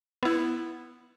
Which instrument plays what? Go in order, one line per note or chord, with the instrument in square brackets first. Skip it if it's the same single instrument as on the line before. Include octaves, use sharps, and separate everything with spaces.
[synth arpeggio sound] B3 E4